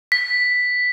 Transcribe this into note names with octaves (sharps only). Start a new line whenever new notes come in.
B6